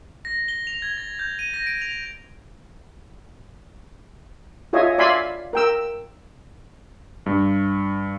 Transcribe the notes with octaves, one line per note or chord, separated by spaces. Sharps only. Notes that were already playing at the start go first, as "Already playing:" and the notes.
A#6
G7
F7
G#6
A6
G6
D#7
A#6
D7
F7
F4 G#4 C#5 D#5 E5 G#5
D5 E5 F5 G#5 B5 C6
A#4 G5 E6
G2